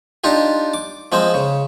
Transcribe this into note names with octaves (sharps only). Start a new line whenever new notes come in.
D4 D#4 F4 G4
D6
F3 G#3 C4 C5
C#3